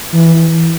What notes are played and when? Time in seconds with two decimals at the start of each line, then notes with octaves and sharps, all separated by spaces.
0.13 E3